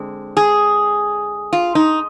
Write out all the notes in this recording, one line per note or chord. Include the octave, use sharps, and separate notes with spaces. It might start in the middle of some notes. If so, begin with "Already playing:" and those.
Already playing: D3 G#3 C4
G#4
F4
D#4